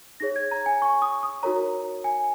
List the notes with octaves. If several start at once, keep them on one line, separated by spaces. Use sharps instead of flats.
D#4 G#4 C#5 A#6
G#6
A#5
G#5
C#6
D#6
D#6
D#4 F#4 A#4 C#5 A#5
G#5